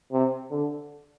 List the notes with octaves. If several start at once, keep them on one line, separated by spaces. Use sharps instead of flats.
C3
D3